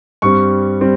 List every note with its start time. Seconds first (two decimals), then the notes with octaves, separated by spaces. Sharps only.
0.22 G2 G3 C4 C#6
0.81 G3 C4